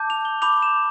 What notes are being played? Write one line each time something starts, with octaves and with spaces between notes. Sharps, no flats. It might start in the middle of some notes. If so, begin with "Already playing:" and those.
Already playing: A5 D6 G6
F7
G7
B5 D6 G6 F7
E7